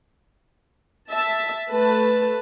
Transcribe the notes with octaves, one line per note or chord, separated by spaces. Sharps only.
E5 A5
A3 B4 A5